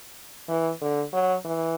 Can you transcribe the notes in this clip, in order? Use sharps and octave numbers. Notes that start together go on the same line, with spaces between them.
E3
D3
F#3
E3